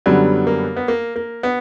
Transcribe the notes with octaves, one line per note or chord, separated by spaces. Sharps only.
F#2 D3 F#3 G3 B3
A#3
B3
A#3
A#3
B3